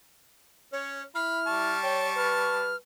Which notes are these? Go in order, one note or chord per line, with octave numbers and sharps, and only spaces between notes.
C#4 C#5
E4 B5 F6
G3 A5 C#6
C#5 G5
B4 F6